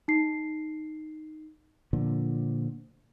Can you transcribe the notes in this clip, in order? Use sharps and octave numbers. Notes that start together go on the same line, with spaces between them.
D#4 C7
A#2 D3 F3